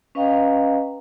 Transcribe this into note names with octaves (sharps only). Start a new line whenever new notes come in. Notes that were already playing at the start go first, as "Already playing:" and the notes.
C#4 B4 D#5 F5 G5 A#5